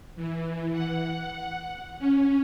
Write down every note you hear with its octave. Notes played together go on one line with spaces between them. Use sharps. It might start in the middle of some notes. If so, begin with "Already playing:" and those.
E3
F#5
C#4